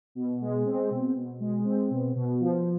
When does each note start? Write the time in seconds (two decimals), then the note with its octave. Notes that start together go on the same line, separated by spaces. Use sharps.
0.15 B2
0.41 G#3
0.66 C4
0.91 B2
1.15 B2
1.40 G#3
1.65 C4
1.90 B2
2.15 B2
2.40 F3